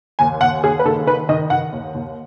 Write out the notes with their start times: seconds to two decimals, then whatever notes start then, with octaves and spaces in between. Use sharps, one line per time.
0.19 D#2 G#5
0.41 D#2 F#5
0.63 D#2 G#4
0.79 B4
0.85 D#3 A4
1.07 D#3 B4
1.29 D#3 D#5
1.50 D#3 F#5
1.72 D#2
1.94 D#2